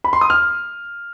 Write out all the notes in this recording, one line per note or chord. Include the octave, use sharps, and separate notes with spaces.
B5
C6
D#6
F6